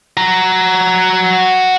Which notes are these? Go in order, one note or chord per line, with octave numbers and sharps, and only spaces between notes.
F#4 A#5